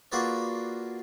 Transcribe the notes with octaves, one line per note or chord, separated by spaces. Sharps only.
A#3 F4 F#4 G#4 B4 D5